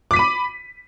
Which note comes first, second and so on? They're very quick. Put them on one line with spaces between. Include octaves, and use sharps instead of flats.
D6 B6 D#7 B5